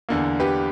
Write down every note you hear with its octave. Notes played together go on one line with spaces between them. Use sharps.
E2 D3 A#3
G4 B4